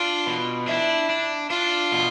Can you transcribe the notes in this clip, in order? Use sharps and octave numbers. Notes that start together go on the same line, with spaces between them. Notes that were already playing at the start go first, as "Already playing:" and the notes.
Already playing: D4 F4
B2
D4 E4
D4
D4 F4
B2